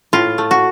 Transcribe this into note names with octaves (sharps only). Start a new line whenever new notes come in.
A2 F4
A3
F#4